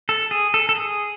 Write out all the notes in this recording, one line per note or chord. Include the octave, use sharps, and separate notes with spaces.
A4
G#4
A4
A4
G#4